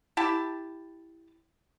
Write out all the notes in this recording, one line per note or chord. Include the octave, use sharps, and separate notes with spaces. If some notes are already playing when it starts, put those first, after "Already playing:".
E4 G4 A5